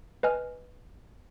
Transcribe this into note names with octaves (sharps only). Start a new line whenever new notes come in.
B4 D#5 G#5 F6